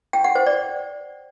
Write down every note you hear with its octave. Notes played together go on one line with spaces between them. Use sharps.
G5
F#5
C5
D5